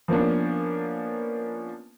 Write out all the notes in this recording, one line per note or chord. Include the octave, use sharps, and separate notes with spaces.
F3 A#3 B3 C#4 D4